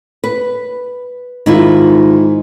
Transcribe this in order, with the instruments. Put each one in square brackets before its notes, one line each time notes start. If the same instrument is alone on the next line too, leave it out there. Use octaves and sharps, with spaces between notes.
[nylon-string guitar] B4
[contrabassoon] G#2 [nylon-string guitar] D#3 E4 F4